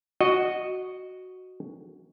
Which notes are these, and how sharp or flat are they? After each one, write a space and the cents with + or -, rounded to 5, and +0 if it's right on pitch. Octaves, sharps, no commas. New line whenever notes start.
F#4 +0 D#5 -10